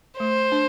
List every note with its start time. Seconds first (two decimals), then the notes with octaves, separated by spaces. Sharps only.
0.19 A3 C5
0.52 D4